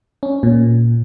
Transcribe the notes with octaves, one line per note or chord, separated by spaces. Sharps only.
C#4
A#2